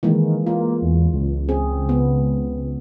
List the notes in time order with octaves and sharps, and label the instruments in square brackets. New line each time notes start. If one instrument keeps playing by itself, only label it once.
[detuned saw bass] D#3 [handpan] E3 G#3 A#3
[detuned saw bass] A#3 [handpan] F4
[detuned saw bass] E2
C#2
[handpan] C4 G#4
B3